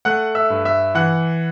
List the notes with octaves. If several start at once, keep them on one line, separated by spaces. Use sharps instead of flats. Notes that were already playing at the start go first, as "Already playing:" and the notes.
A3 F#5 F#6
E5 E6
G2
E5 E6
E3 F#5 F#6